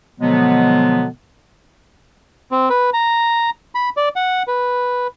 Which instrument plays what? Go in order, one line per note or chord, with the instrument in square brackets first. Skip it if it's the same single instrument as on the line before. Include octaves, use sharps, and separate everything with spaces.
[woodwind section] B2 D3 F3 F#3 G#3 B3
[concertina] C4
B4
A#5
B5
D5
F#5
B4